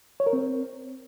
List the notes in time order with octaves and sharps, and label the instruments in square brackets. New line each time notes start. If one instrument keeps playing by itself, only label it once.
[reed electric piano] C#5
A#4
C4